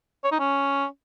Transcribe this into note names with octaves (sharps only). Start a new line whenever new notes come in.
C#5
D#4
C#4